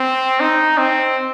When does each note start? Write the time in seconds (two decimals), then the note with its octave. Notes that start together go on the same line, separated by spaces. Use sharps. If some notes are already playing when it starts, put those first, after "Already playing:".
Already playing: C4
0.40 D#4
0.78 C4